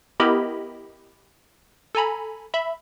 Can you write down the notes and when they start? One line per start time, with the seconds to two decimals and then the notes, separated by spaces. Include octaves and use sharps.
0.20 B3 E4 G4 A#4 D#5 B5
1.95 A4 G#5 A#5 B5
2.54 E5 B5